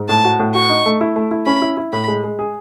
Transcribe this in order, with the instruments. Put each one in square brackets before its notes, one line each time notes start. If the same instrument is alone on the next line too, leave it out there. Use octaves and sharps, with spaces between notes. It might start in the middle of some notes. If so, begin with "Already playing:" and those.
Already playing: [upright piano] G#2
[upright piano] A2 [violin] A5
[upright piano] F#4
A2
[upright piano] F#4 [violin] C#6
[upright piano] D#4
A3
E4
A3
E4
[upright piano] C#4 [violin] B5
[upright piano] E4
E4
[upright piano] A2 [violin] B5
[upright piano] G#3
G#3
G#4